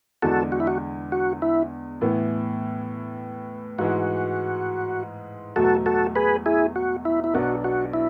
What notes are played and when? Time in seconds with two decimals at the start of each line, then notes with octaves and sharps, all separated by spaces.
0.22 E2 D3 G#3 D4 F#4 A4
0.52 F#4
0.60 E4
0.67 F#4
1.12 F#4
1.42 E4
2.01 A2 E3 B3 E4
3.78 G#2 E3 G#3 F#4
5.56 E2 B2 F#3 A3 F#4 A4
5.86 F#4 A4
6.16 G#4 B4
6.46 E4 G#4
6.76 F#4
7.05 E4
7.24 E4
7.34 B1 B2 F#3 B3 D4 F#4
7.64 F#4
7.94 E4